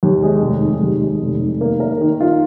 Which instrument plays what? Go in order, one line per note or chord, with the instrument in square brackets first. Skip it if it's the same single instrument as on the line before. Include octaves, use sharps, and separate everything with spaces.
[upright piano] D#2
G#3
F1
D#3
D#2
G#3
F1
D#3
A#3
A#4
D#3
F4